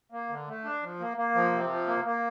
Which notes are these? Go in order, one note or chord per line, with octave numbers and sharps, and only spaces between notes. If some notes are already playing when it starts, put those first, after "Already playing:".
A#3
D3
A3
D4
F3
A#3
A#3
F3
C3
F3
A#3
A#3